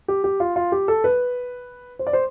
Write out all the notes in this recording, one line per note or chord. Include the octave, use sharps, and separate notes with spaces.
G4
G4
F4
F4
G4
A4
B4
C5
D5
C5